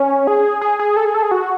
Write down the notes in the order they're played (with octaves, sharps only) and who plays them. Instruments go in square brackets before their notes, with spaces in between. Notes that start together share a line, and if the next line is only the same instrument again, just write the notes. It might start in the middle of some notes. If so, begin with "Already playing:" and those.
Already playing: [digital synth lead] C#4
G#4
G#4
G#4
A4
G#4
A4
G#4
F#4